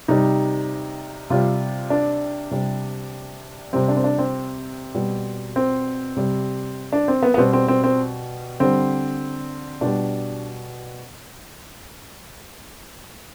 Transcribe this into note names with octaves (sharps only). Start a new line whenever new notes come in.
C3 G3 D#4
C3 G3 F4
D4
C3 G3
C3 G3 C4
D4
C4
D4
C4
B2 G3
C4
C3 G3
D4
C4
B3
B3
B2 G3 C4
C4
C4
C4
D3 G3 C4
B2 G3 D4